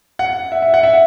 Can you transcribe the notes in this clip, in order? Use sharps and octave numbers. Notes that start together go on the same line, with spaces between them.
F#5
E5
E5
F#5
E5